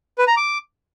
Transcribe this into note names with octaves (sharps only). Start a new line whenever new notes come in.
B4
A#5
D6